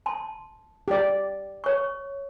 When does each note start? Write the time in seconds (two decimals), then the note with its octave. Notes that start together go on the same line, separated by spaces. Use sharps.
0.06 A5 C6
0.88 G4 D5
1.64 C#5 C#6